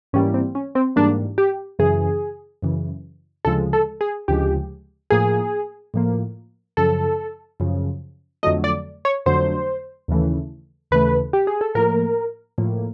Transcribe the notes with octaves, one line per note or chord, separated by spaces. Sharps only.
G#2 E3 G3 A#3 C#4
C4
C#4
C4
G#2 E3 G3 A#3 D4
G4
F#2 C#3 E3 G#4
F#2 C#3 E3
D2 C#3 F3 G#3 A4
A4
G#4
D2 C#3 F3 G#3 G4
A2 F3 A#3 G#4
A2 F3 A#3
F#2 C#3 F3 A4
F#2 C#3 F3
F2 D3 F#3 A3 D#5
D5
C#5
F2 D3 F#3 A3 C5
D#2 C#3 E3 A3
D#2 C#3 E3 A3 B4
G4
G#4
A4
A2 F3 A#3 A#4
A2 F3 A#3